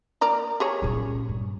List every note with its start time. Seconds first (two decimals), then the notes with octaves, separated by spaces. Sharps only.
0.21 A#3 A#4 D5
0.60 G4 G#4 C#5
0.82 A#2 C#4
1.29 G2